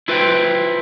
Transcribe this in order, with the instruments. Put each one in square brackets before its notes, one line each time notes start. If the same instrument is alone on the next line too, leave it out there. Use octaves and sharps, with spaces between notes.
[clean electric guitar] E4 F4 B4 C5 F5 G5